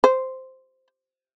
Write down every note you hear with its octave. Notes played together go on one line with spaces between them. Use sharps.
C5